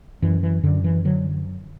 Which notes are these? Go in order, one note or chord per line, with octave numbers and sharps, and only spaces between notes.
F#2 E3
E3
F#2 D3
E3
D3 F#3